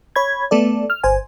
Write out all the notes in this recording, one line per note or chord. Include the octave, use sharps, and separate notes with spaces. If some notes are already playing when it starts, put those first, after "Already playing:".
C#5 B5 G#6
A3 B3 A4 D5
F6
G1 C5 G#5